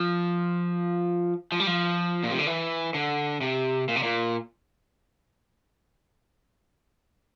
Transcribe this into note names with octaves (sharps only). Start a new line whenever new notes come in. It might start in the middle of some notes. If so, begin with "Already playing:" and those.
Already playing: F3
F3
G3
F3
A#2
C3
D3
E3
D3
C3
A#2
C3
A#2